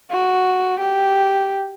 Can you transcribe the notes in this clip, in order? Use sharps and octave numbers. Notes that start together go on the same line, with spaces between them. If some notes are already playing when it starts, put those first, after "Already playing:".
F#4
G4